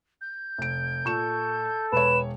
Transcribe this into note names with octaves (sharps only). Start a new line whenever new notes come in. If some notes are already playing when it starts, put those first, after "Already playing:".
G6
F1 D7
A#2 A4 C#6 E7
E1 B4 C#5 E7